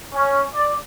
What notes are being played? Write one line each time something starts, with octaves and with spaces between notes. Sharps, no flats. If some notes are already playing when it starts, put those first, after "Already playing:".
C#4
D5